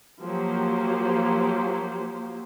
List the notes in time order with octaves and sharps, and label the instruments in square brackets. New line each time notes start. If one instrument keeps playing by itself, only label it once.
[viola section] F3 F#3 A#3 G4 C5